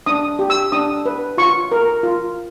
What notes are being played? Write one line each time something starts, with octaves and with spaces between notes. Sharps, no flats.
D4 D#6
G4
E6
D4 D#6
B4
F4 C#6
A#4
F4